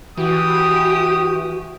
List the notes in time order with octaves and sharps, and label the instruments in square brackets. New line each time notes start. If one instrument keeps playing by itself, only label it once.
[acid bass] E3 [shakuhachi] F#4 [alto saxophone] G4 [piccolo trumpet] D#6